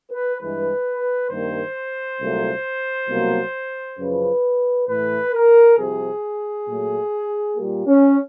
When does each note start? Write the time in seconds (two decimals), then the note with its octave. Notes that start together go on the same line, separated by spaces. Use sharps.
0.11 B4
0.40 G2 E3 G#3 B4
1.29 G2 D#3 G3 A#3 C5
2.20 C2 A#2 F#3 A3
3.09 C2 B2 F#3 A#3
3.99 F#2 C#3 F3 B4
4.88 A2 E3 A3 B4
5.33 A#4
5.78 C2 C3 F3 G#4
6.67 A#2 F#3 A3
7.57 A#2 G3 A#3 G4
7.86 C#4